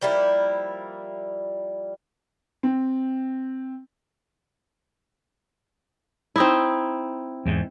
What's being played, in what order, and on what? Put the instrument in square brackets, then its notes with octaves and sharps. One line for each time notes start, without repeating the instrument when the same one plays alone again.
[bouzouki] F3 G3 A#3 E4
[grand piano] C4
[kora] C4 D#4 E4
[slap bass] E2 G#2